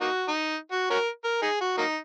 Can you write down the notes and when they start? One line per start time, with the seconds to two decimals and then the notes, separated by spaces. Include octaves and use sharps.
0.01 A#3 D#4 F#4
0.28 D#4
0.72 F#4
0.90 C#4 F#4 A#4
1.24 A#4
1.42 D#4 G#4
1.61 F#4
1.78 F#3 A#3 D#4